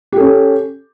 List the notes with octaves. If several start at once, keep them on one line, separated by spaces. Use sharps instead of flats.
C#4 G4 A4